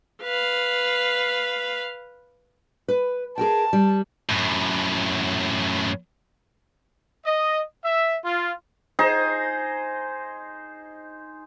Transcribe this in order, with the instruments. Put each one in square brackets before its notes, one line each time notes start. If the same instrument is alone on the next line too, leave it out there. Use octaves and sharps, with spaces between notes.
[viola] B4 F5
[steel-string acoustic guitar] B4
[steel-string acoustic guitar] G#4 A#4 G5 [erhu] A5
[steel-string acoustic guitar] G3
[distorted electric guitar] F#2 A2
[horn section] D#5
E5
F4
[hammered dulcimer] D#4 G#4 C5 A#5